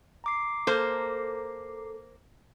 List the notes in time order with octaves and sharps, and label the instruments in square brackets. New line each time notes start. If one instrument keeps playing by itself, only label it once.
[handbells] A#5 D6 C7
[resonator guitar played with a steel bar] A#3 C5 [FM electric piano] A4